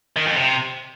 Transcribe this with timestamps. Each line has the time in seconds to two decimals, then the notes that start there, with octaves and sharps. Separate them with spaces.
0.16 D#3
0.27 F2
0.37 C3